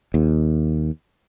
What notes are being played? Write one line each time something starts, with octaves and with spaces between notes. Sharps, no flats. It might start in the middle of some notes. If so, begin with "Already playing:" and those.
D#2